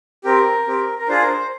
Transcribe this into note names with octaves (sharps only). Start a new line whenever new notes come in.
C4 G4 A#4
C4 G4
A#4
D4 F4 G#4 C5
A#4
C5